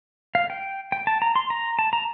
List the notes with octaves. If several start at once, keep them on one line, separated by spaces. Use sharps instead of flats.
F5
G5
G5
A5
A#5
C6
A#5
A5
A#5